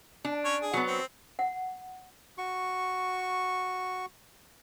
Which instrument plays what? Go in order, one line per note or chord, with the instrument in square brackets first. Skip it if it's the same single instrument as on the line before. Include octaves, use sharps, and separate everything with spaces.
[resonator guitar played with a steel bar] D4
[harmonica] C#4 C#5
G#4
[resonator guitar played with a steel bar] F#3 B3
[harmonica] C4
[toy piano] F#5
[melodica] F#4 C#6